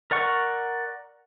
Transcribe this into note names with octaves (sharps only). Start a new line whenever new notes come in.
A#4 D5 F#5 C#6